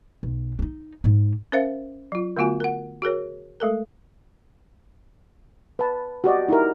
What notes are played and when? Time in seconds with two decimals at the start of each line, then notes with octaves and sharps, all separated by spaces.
0.23 B1
0.59 D4 D#4
1.04 G#2 G#3
1.52 C#4 A#4 C5 E5 F5
2.12 F#3 F4
2.36 D3 A3 B3 F4 F#4 G#5
2.60 A#4 F#5
3.02 F#4 G#4 A#4 C#5
3.60 G#3 A3 A4 A#4
5.79 B4 A5
6.24 F#4 G4 D5 D#5
6.48 D#4 E4 G4 A#4